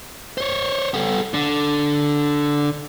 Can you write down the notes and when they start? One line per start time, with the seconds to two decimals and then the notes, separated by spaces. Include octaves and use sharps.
0.38 C5 C#5
0.94 B3 A4
1.34 D3